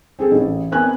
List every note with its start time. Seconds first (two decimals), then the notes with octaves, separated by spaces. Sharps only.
0.19 C4 G#4 A4
0.32 A1
0.72 B3 C4 A#4 G#5 F#6